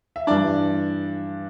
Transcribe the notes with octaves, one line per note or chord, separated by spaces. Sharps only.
E5
G2 E3 G3 D4 D5